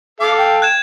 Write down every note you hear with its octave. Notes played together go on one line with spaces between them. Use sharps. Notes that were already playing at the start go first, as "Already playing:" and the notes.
A4 F5 D6
G5
F#6 G#6 E7